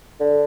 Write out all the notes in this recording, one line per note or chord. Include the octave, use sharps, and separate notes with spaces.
D3